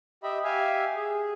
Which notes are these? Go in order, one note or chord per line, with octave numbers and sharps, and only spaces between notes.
G4 D#5 E5 B5
G4 E5 F5 G#5
G#4